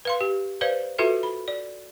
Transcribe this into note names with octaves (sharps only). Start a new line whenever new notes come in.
B4 F5 C6
G4
B4 C5 D5 F5
F4 F#4 A4 B4 E5
B5
D5